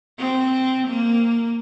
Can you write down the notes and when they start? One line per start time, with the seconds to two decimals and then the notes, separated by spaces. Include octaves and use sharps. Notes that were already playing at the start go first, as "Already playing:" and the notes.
0.19 C4
0.87 A#3